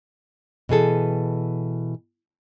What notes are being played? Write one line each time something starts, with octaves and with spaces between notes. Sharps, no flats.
B2 E3 G#4 A4